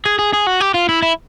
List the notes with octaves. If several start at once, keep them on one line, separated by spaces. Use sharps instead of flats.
G#4
G#4
G#4
F#4
G4
F4
E4
E4